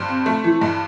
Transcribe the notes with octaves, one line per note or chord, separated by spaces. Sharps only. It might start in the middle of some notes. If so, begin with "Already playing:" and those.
Already playing: G2 C5
C4
A3
E3
G2